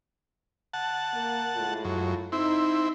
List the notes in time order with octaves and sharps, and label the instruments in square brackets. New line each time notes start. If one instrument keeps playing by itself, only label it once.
[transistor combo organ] F#5 A5
[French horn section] A#3
A2 G#3 F4
[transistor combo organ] F#2
[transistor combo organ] C4 E4 [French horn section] D#4